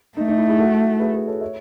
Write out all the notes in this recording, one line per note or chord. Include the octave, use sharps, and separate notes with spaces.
A3 D#4
D#4
E4
E4 G#4
F#4 A4
G#4 B4
G#4 B4
A4 C#5
C#5 E5